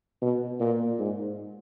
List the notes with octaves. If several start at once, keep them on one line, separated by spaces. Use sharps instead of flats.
B2
A#2
G#2